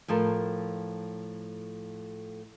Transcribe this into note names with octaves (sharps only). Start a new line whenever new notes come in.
A2 F3 A4 A#4